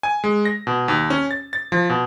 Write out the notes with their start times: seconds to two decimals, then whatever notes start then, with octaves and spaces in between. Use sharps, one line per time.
0.03 G#5
0.24 G#3
0.45 A#6
0.67 B2
0.88 D#2
1.10 C#4
1.31 A6
1.53 A6
1.72 F3
1.90 B2